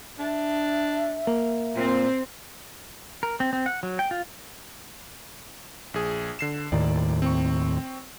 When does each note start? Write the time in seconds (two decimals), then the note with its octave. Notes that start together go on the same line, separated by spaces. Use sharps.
0.19 D4 E5
1.27 A#3
1.76 A#2 C4 C5
3.23 A#4
3.40 C4
3.53 C4
3.66 F#5
3.83 F#3
3.99 G5
4.11 F4
5.94 A#1 G#4
6.39 D3 C7 E7
6.72 D#2 A2 D#3 D5
7.22 C4 C#6